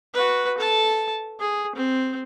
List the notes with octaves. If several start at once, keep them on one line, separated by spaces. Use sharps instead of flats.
F#4 B4
A4 A5
G#4
C4